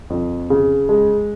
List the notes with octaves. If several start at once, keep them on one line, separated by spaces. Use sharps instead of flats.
F2
C#3
G#3